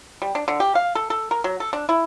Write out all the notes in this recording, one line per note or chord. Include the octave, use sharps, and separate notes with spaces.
G3
D4
D3
G4
F5
A4
A4
A#4
F#3
A4
D4
E4